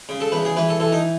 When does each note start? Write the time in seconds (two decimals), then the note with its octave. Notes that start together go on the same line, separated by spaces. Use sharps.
0.09 C#3
0.20 A4
0.32 E2 B4
0.45 G#4
0.56 E3 B4
0.69 A4
0.80 E3 A4
0.92 D#4